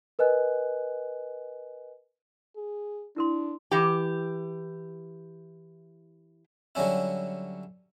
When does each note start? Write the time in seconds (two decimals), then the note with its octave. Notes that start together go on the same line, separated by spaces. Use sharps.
0.19 A#4 B4 D#5 G#5 F#6
2.56 G#4
3.16 D4 E4 A#4 C6
3.71 E3 G4
6.75 D3 F#3 G3 C#4 E4